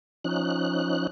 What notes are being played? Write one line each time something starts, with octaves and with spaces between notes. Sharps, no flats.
F3 C#4 D#4 F#6